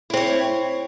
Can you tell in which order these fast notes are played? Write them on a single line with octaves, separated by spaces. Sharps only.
E4 C4 C#5